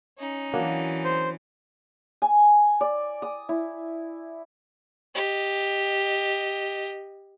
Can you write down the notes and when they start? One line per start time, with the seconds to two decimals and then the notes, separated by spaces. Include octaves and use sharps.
0.18 C#4 D#4
0.54 E3 F#3 A#3 D4
1.04 C5
2.22 G#5
2.81 D5
3.22 D#6
3.49 E4
5.15 G4 D#5